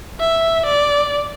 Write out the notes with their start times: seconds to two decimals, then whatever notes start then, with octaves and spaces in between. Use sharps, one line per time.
0.21 E5
0.66 D5